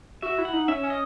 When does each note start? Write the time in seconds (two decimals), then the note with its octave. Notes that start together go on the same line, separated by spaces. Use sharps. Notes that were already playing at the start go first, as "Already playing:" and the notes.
0.22 F#4 E5
0.38 E4
0.45 F#5
0.53 D#4
0.68 C#4 E5
0.83 C#4
0.90 D#5